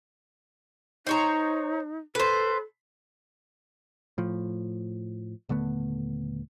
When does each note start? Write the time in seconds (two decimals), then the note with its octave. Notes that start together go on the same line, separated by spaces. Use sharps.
1.07 D#4 C5 C#5 A#5
2.15 A4 B4 C5
4.18 A2 F3
5.49 D#1 D3 A3 B3